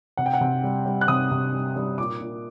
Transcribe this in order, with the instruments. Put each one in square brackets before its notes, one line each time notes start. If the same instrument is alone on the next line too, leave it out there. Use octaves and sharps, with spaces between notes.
[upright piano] C3 F#5
G5
F#5
C3
G3
G3
F#6
C3 D#6
C3
G3
G3
A#2 D6
A#2